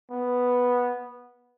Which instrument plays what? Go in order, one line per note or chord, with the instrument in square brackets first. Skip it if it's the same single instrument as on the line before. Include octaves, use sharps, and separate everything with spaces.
[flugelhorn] B3